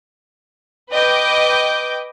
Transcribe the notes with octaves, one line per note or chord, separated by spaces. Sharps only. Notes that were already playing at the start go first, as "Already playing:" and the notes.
B4 D#5 G5 D6 G6